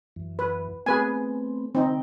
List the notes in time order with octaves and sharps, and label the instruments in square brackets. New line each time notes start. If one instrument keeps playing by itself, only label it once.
[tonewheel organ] F#2 E3
[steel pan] B4
[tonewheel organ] A3 B3 C4 [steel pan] G#4 B4 G#5
[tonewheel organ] D3 G5 [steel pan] C4 D#4